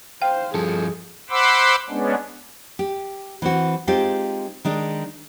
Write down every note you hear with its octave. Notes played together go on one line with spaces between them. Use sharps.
C5 F5 G5
G2 F3 G#4 A4
C5 F#5 B5 C6 D6 E6
G#3 B3 C#4 D4
G4
E3 C4 F#4
G#3 C4 D#4 F4 G4
D#3 G#3 D4